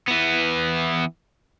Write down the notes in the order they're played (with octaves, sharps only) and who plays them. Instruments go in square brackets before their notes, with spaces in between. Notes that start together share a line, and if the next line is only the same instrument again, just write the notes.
[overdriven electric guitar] E3 B3